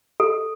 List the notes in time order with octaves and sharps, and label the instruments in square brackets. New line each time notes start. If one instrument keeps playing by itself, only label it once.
[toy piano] A4